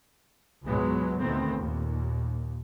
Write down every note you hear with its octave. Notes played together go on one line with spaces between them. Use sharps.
C#2 G#2 B2 F#3 G#3 B3
D2 A#2 D#3 A3 B3 C4
D#2 A#2